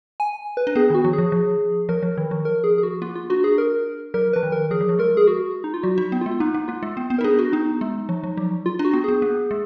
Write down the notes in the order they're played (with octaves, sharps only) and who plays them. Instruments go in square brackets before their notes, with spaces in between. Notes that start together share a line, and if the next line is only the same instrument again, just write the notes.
[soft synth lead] G#5
B4
[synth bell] D4
[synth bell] B3 [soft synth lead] G#4
[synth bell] D#3 [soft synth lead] F#4
[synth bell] F3
[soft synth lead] G#4
[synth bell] F3
F3
[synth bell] F3 [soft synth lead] A#4
[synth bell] F3
D#3
F3
[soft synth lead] A#4
G#4
G#4
F#4
[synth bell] A#3 [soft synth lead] F4
[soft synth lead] F4
[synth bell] D4 [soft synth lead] F#4
[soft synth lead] G#4
A#4
[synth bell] F#3 [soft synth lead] A#4
[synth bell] F3 [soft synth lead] B4
[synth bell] D#3
[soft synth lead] A#4
[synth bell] F3 [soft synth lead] G#4
[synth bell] F#3
F3
[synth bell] G#3 [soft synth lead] A#4
[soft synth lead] G#4
F#4
D#4
F4
[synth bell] F#3 [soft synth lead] F#4
[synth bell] D#4
B3
[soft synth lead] F4
[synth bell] G#3
[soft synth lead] F4
[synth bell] A#3 [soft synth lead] D#4
[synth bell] A#3
[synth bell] A#3 [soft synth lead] F4
[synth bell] G#3
B3
B3
[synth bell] D#4 [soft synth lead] A#4
[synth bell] D4 [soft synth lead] G#4
[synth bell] D4 [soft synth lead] F#4
[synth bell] B3 [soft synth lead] D#4
[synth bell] G#3
F3
F3
F#3
[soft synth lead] F4
[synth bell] D4
[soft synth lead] F#4
[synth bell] B3
[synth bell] B3 [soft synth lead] G#4
[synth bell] A#3
G#3